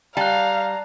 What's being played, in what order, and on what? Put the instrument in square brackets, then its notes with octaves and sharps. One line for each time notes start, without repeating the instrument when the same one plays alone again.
[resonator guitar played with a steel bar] G3 [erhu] F5 [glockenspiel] A5 F#6 [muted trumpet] A#5